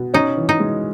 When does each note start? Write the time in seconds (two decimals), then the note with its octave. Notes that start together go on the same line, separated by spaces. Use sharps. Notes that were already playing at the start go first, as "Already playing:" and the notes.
Already playing: B2
0.14 C#4 D#4
0.37 E3
0.49 D#4
0.60 G#3